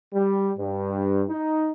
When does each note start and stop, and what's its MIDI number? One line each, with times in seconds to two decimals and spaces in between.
0.14 0.50 55
0.58 1.23 43
1.29 1.70 63